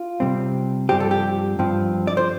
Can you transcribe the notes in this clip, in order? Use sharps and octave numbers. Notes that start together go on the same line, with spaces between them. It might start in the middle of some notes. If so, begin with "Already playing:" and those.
Already playing: F4
C3 G3 C4
G2 F3 C4 G4
A4
G4
G2 F3 C4
D5
C5